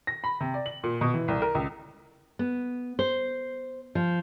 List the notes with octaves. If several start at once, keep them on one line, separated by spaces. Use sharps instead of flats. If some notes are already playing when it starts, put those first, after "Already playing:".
A#6
B5
C3
D5
F#7
A#2
B2
E3
C2
A#4
C#2
B3
C5
F3